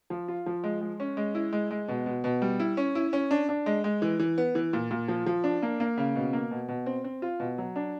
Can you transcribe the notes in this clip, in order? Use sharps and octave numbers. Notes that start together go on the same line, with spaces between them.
F3
F4
F3
G#3
G#3
C#4
G#3
E4
G#3
G#3
B2
B2
B2
G3
E4
C#4
E4
C#4
D4
D4
G#3
G#3
E3
E3
B3
E3
A#2
A#2
F3
F3
D4
A#3
A#3
C#3
B2
A#3
B2
B2
C4
C4
F4
B2
F#3
D4